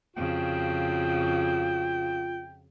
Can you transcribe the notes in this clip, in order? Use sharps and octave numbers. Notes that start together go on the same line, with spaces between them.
F2 C#3 F4 F#4 G5